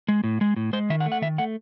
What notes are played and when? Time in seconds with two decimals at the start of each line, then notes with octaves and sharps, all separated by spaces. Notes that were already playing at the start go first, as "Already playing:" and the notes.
0.08 G#3
0.24 A2
0.41 G#3
0.56 A2
0.73 G#3 C5
0.90 D#3 E5
1.00 F#5
1.06 A3
1.12 F#5
1.22 D#3 E5
1.38 A3 F#5